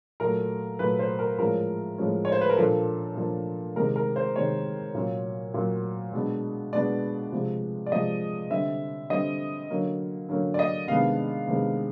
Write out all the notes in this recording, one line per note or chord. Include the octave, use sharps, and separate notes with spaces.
A#2 F#3 A3 A#4
A#2 F#3 A3 B4
C5
A#4
A2 F3 G#3 C#4 A#4
A2 F3 G#3 C#4
C#5
C5
B4
A#4
A#2 F3 A#3 D4 A4
A#2 F3 A#3 D4
C3 D#3 G#3 A#4
A#4
C5
C3 D#3 G#3 C#5
A#2 F#3 A#3 C#4
A#2 F#3 A#3 C#4
B2 G#3 B3 D4
B2 G#3 B3 D4 D5
C3 F3 G#3
D5
C3 F3 G#3 D#5
D3 G3 C4 E5
D3 G3 C4 D#5
D3 F#3 A#3 C#4
D3 F#3 A#3 C#4
D5
D#5
C3 D#3 G#3 B3 D4 F5
C3 D#3 G#3 B3 D4